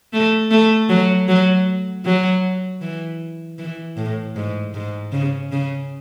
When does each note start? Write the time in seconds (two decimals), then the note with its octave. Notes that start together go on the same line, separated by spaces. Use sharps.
0.13 A3
0.51 A3
0.89 F#3
1.28 F#3
2.05 F#3
2.81 E3
3.59 E3
3.97 A2
4.36 G#2
4.74 G#2
5.12 C#3
5.52 C#3